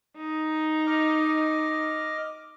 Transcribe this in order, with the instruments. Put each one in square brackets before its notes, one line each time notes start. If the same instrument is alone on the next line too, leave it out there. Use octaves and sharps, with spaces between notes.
[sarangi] D#4
[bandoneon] D#5 D6 F6